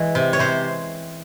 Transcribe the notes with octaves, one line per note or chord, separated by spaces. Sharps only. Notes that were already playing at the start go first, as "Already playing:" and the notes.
Already playing: E3 G#3
C3
C#5
C3 C5